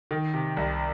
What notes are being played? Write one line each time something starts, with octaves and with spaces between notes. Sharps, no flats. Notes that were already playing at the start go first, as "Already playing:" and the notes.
D#3
C3
C2